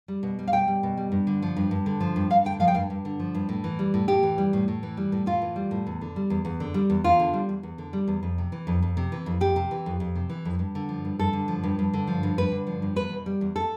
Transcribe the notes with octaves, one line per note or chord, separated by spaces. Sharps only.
G3
B2
G3
F5
B2 G5
G3
B2
G3
G2
D3
F3
G2
G2
D3
F3
G2
G2 F5
D3 G5
F3 F5
G5
G2 F5
G2
D3
F3
G2
A2
E3
G3
A2
A2 G4
E3
G3
A2
A2
E3
G3
A2
A2 F4
E3
G3
A2
E2
D3
G3
E2
E2
D3
G3
E2
E2 F4
D3
G3
E2
E2
D3
G3
E2
F2
C3
E3
F2
F2
C3
E3
F2
F2 G4
C3
E3
F2
F2
C3
E3
F2
G2
D3
F3
G2
G2 A4
D3
F3
G2
G2
D3
F3
G2
G2 B4
D3
F3
G2
E2 B4
B2
G3
E2
A4